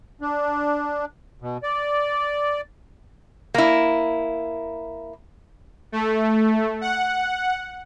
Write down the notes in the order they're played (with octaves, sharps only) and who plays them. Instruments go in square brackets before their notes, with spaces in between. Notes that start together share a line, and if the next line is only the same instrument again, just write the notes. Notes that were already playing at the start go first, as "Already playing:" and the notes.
[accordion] D4
B2
D5
[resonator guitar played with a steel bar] A#3 E4
[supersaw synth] A3
F#5